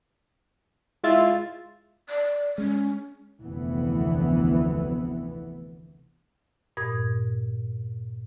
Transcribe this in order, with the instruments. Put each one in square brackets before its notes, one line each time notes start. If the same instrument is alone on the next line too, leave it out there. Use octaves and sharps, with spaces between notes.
[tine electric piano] G#3 F4 A6 [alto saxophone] E4
[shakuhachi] D5
[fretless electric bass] G#3 [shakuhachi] C#4
[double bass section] F1 D2 E3 B3
[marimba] G2 A#2 D#6 G#6